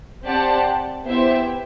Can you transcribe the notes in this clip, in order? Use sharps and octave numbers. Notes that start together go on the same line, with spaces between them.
C4 G4 D5 F#5 A5
B3 E4 G4 C5 E5